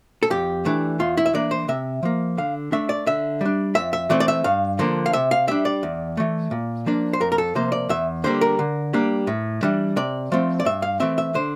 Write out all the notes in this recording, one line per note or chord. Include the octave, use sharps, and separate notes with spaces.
A4
F2 G4
E3 A3 D4
E2 F4
E4
E5
E3 A#3 D4 D5
C5
C3 E5
F3 A#3
D3 F5
A3 D4 E5
D5
D3 E5
G3 D4
F2 E5
E5
E3 A3 C4 D5
D5
E5
G2 F5
D3 F3 A#3 D4
F5
C3 E5
F5
G3 D4 E5
D5
E2
E3 A3
A#2
F3 A#3 D4
C5
F2 A#4
A#4
A4
C3 F3 A#3 C5
D5
E2 E5
D3 G3 A#3 C5
A#4
D3
G3 A#3 D4
A2
E3 G3 D4
C3 D5
F3 A3 C4
D5
G2 E5
F5
E3 A3 C4 E5
E5
D3 C5